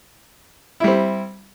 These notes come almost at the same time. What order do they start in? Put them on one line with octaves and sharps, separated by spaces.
E4 G3 C4